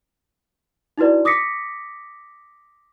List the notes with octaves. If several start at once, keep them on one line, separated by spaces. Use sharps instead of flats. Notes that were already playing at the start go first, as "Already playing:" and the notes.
D#4 E4 F#4 B4 D5
D6 D#6 A#6 B6 C#7